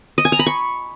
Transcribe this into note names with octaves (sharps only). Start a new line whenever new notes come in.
D#5
G#5
A#5
B5
C#6